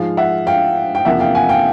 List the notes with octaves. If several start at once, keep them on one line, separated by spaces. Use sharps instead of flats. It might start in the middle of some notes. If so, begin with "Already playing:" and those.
Already playing: G#2 F3 G#3 F5
E5 F#5
F5 G5
G5
E2 C3 F3 A#3 E5 F#5
F5 G5
F#5 G#5
F5 G5